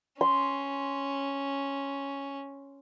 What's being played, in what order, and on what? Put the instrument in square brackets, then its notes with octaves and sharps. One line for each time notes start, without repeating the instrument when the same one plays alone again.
[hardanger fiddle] C#4 [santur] C6